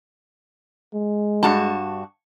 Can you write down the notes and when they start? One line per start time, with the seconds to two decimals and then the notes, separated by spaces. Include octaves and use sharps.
0.94 G#3
1.43 G2 F#4 A5